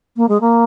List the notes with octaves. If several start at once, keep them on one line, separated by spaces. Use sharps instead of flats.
A#3
G#3
A#3